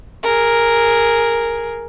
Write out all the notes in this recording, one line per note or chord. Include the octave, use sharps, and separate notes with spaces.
G#4 A#4